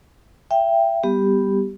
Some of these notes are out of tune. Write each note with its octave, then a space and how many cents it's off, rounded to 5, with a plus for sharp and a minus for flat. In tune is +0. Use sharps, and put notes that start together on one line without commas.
E5 +30 G5 +0
G3 +0 B3 +0 G4 +0